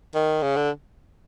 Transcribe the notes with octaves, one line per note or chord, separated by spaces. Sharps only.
D#3
C#3
D3